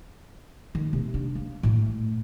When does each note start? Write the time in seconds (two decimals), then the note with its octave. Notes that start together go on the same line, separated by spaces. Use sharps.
0.75 D#3
0.93 C3
1.14 D4
1.35 A#3
1.63 A2 A3